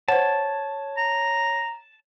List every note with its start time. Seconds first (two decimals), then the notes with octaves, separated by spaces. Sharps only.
0.08 C5 C#5 F#5 A5
0.97 A#5